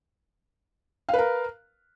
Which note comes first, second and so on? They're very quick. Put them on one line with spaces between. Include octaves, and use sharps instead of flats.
F5 B4 A#4